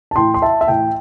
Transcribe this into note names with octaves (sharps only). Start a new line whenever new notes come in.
A5
A2 E3 G5 C6
C6
E5 A5
E5
A2 E3 G5